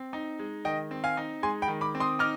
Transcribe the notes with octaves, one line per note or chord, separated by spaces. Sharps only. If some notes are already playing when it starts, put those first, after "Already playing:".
Already playing: C4
D#4
G#3
D#3 D#5 G5
C4
F5 G#5
D#4
G#3 G#5 C6
G5 B5
D#3
B5 D6
C4
C6 D#6
D#4 D6 F6